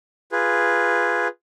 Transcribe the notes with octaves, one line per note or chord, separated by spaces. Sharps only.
F4 G#4 B4